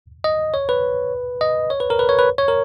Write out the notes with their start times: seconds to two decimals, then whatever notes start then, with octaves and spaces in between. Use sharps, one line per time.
0.24 D#5
0.54 C#5
0.69 B4
1.41 D#5
1.70 C#5
1.80 B4
1.90 A#4
1.99 B4
2.09 C#5
2.19 B4
2.38 C#5
2.48 A#4